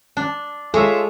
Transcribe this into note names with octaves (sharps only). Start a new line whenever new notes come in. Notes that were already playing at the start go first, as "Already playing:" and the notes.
D4
G#3 F4 A4 C#5 E5